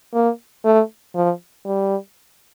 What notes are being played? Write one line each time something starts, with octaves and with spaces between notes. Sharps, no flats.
A#3
A3
F3
G3